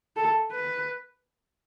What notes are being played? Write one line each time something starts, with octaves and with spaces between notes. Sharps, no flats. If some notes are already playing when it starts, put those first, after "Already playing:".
A4
B4